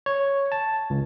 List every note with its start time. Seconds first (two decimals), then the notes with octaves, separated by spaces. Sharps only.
0.06 C#5
0.52 A5
0.90 C#2